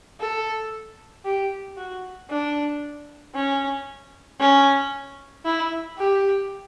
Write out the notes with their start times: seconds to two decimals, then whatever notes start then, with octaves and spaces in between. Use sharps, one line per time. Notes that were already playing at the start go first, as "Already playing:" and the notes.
0.20 A4
1.25 G4
1.77 F#4
2.30 D4
3.35 C#4
4.40 C#4
5.45 E4
5.98 G4